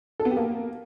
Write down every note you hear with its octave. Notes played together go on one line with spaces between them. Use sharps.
A4
B3
G4
A#3